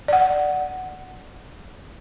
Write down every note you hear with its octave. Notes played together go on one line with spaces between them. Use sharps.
D5 F#5